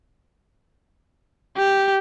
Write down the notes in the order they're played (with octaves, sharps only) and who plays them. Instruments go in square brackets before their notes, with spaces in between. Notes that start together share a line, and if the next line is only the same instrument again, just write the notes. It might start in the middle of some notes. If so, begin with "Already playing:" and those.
[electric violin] G4